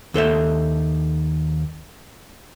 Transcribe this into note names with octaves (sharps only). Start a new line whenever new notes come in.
D#2 A4 C5 E5